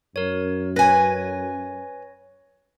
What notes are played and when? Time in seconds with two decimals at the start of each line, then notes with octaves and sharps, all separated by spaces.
0.16 F#2 A#4 C#5
0.76 B4 C#5 G#5 A#6